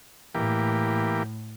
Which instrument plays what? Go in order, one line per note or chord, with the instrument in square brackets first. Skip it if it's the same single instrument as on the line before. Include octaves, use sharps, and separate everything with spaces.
[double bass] A2 [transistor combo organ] E3 A#3 G4